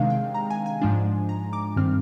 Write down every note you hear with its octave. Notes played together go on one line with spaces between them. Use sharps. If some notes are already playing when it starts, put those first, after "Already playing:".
Already playing: C3 D#3 G#3 D4 F5
G5
A#5
G#5
G#5
G#2 F3 G#3 D4
A#5
D6
G2 D#3 G3 C4 F6